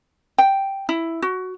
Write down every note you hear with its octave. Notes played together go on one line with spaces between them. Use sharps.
G5
E4
F#4